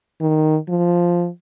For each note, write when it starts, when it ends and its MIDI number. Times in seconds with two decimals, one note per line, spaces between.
0.21 0.57 51
0.69 1.28 53